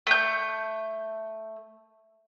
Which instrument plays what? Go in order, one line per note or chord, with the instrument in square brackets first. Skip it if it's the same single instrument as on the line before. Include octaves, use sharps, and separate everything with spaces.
[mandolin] A3 G6